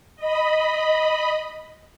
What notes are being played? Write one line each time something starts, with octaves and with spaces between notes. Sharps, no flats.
D#5 B5